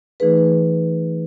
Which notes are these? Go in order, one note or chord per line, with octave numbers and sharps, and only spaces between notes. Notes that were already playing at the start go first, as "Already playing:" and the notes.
E3 A3 D#4 G#4 B4